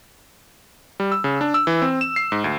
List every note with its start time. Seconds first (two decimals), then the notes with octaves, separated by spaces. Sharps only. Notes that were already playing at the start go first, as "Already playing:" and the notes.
1.00 G3
1.12 E6
1.24 C#3
1.41 D4
1.54 E6
1.67 E3
1.82 C4
2.01 E7
2.16 C7
2.32 G#2
2.44 D2